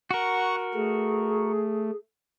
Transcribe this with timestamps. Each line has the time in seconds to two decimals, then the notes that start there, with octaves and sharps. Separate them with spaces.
0.11 F#4 A#4 F#5 C#6
0.74 A3 G#4